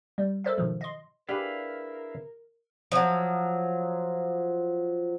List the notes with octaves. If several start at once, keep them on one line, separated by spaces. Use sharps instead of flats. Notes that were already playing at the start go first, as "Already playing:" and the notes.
G3
A4 A#4 C5 D5 E5
G#2 B2 D#3 F3 F#3
D#5 C6
D4 E4 G4 G#4 A#4 B4 F5
F3 F#3